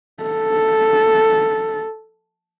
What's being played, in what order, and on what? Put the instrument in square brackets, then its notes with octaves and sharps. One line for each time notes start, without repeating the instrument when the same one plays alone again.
[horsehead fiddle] A4